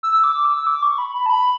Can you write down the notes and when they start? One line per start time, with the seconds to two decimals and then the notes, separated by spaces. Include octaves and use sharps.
0.03 E6
0.24 D6
0.45 E6
0.67 D6
0.82 C#6
0.98 B5
1.15 B5
1.26 A5
1.30 B5